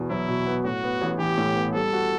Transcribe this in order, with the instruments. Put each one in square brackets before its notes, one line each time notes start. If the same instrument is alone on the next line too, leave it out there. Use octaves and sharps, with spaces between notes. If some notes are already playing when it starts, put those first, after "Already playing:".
Already playing: [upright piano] E2 B2 B3
[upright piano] F#3 [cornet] E4
[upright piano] B2
B3
[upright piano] A2 [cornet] F#4
[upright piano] B3
A1
[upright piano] E3 [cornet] G4
[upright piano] A2
B3
[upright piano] G3 [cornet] A4
[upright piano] F#4